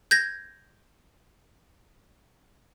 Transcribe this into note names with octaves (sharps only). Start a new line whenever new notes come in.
G6 G#6 A#6